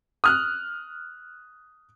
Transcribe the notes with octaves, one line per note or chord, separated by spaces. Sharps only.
D#6 F6 F#6